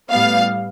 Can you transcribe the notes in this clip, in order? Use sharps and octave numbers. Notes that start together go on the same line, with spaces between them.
A2 G3 B3 F5